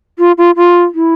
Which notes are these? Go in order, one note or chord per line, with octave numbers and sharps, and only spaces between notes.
F4
F4
F4
E4